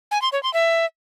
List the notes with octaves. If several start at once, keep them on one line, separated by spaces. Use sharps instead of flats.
G#5
C6
C#5
C6
E5